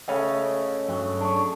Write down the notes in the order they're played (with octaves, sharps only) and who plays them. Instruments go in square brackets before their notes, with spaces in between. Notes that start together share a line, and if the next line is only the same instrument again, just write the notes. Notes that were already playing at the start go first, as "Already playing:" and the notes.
[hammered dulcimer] C#3 A3 [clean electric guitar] C#5 D#5 F5
[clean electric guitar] G2 F#3
D4 C#5